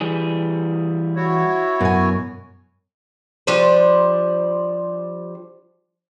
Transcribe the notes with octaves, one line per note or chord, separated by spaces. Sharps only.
E3 G3 G#4
E4 F#4 C#5
F#2 B2 G#5
F3 G3 D4 C5